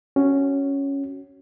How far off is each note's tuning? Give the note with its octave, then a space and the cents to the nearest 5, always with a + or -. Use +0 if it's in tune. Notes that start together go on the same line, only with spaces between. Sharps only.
C#4 +0 F#4 +15